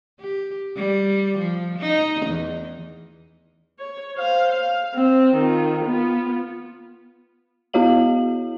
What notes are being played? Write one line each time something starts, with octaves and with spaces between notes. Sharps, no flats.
G4
G3
F3
D#4
E2
C#5
C5 F5
F5
C4
D#3 F4
B3 F4
B3 E4 F#4 C#5 F5 F#7